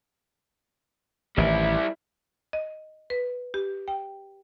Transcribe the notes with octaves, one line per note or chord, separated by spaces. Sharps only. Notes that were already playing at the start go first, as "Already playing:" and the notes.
A1 D#3 G3 E4
D#5
B4
G4
G5